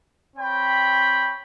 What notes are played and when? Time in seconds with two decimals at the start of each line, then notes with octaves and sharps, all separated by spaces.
0.37 C4 C#5 G5 B5